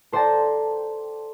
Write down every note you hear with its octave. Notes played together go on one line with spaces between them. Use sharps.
A4 C5 D5 G5 A5 A#5